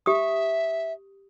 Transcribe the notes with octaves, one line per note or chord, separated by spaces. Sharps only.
G4 E5 D#6